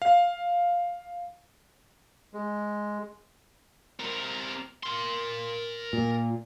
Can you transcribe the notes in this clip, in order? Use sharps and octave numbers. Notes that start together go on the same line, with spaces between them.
F5
G#3
C3 A#4
A#4 C6
A#2